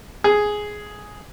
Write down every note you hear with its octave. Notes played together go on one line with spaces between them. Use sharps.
G#4